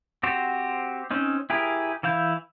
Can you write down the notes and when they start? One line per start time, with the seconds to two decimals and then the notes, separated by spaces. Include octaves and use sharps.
0.23 C4 F#4 G4 C5
1.11 C4 C#4 D#4
1.50 E4 G4 G#4 A#4
2.03 E3 E4 F5 G6